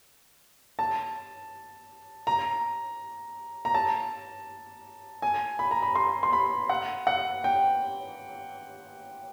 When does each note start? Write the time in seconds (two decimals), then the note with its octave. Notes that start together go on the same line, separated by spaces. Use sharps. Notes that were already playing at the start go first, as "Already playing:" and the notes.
0.79 A5
2.27 A#5
3.65 A#5
3.75 A5
5.22 G#5
5.59 B5
5.71 A#5
5.83 B5
5.96 C6
6.23 C6
6.33 B5
6.69 F#5
7.07 F#5
7.44 G5